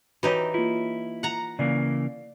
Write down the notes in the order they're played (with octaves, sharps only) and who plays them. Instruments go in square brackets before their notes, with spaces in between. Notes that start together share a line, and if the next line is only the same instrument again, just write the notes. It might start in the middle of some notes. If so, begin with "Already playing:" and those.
[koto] E3 D#4 G4 [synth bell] F#4 C#5
[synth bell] A#3 F4 [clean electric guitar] E4
[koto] F#5 A#5
[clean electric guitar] C#3 E3 A#3 [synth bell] D5 F5